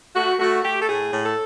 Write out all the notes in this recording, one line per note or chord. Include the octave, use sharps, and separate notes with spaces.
A3 F#4
A3 F#4
A3 G4
A4
A2 G#4
A2
A4